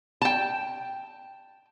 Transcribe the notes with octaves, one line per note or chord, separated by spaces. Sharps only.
G5 A5